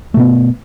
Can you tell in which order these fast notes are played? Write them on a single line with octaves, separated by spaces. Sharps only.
A3 B2 B3